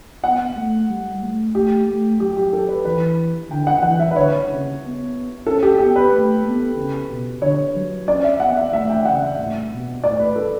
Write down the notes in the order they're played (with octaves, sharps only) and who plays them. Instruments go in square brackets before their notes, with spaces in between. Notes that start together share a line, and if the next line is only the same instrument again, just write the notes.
[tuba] B3 [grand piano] F#5
[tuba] A3
G3
A3
[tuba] A3 [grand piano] G4
[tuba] A3
[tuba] F#3 [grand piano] G4
[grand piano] G4
A4
B4
[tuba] E3 [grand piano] B4
[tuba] D3 [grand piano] G5
[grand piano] F#5
[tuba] E3 [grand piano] F#5
[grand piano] E5
B4
[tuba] D3 [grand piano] C#5
[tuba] C#3
B3
[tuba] C#4 [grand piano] A4
[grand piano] G4
[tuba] B3 [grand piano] G4
[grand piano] B4
[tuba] A3
B3
C#3
B2
[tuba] D3 [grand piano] C#5
[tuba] F#3
[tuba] C#4 [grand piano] D5
[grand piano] E5
[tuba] B3 [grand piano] F#5
[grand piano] E5
[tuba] A3 [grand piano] E5
[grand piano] G5
[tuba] C#3 [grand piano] F#5
[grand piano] E5
[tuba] A2
B2
[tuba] A2 [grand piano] D5
[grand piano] B4
A4